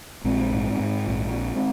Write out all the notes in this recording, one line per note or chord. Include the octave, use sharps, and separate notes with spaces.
A#1 G#3 C4
G#2
G#2
A#1